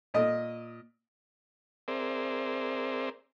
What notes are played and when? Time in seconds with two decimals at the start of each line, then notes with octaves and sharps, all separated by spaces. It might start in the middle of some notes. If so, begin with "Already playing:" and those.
0.14 A#2 D#5
1.88 C4 G#4 A#4 C5 D5 E5